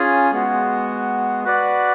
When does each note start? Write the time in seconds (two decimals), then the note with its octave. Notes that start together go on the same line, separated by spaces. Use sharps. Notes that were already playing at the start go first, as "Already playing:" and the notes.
Already playing: C#4 F4 G#4
0.32 G#3 B3 F#4
1.45 F#4 B4 D5